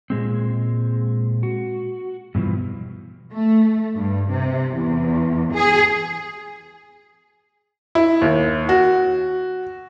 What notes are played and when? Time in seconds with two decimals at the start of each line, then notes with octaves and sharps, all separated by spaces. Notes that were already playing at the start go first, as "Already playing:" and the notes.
0.10 A#2 G#3 C4
1.43 F#4
2.35 G2 B2 E3 F3
3.33 A3
3.94 G2
4.29 C3
4.75 E2
5.53 G#4
7.95 E4
8.21 D#2
8.69 F#4